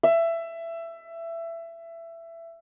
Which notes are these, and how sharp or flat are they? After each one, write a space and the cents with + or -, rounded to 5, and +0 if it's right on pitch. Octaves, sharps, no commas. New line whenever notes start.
E5 +20